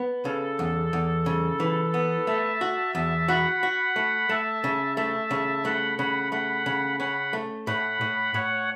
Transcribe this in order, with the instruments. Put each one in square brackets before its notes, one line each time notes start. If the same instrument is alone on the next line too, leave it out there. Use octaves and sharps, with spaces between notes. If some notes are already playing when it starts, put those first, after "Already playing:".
Already playing: [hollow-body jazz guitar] B3
[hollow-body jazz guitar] C#3 [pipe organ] A4
[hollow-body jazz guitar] E2
E2
C#3
E3
B3
[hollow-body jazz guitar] A3 [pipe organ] E5 A5
[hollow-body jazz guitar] F#4
[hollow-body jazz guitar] E2 [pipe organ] E5 A5
[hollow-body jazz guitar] F#4 [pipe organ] F#5 B5
[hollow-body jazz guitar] F#4
A3
[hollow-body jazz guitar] A3 [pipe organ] E5 A5
[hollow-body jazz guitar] C#3
[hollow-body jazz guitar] A3 [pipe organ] E5 A5
[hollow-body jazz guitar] C#3
[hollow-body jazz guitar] A3 [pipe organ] F#5 B5
[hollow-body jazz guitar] C#3 [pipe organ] F#5 B5
[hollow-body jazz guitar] A3 [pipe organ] F#5 B5
[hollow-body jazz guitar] C#3
[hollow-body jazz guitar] C#4 [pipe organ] F#5 B5
[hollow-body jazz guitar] A3
[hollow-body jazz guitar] A2 [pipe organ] F#5 B5
[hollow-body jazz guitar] A2
[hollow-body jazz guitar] A2 [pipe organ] C#5 F#5